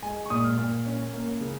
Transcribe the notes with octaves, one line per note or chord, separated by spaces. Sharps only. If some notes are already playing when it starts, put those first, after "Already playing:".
G#3 G#5
C#6
A#2 D#6
F6
A#2
C#4
A#3
C#3